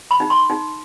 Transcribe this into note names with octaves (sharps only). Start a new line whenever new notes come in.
B5
D#4
C6
D#4